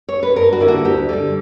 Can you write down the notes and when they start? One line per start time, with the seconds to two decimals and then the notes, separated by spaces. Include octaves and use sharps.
0.09 C#5
0.23 B4
0.36 G2 A#4
0.53 F#4
0.61 D3 A#3 E4
0.68 F#4
0.85 D2 G4
1.09 D3 G3